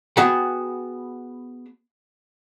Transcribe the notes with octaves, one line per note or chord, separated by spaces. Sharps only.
B3 F#4 G#4 F#5 G5